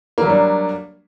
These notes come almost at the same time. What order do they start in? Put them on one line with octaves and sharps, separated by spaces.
A#3 F#3 G3 D4